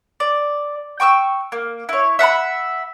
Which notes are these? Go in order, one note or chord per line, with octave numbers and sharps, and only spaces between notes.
D5
G5 C#6 D6 E6
A#3
E4 C#5
E5 F#5 A5 B5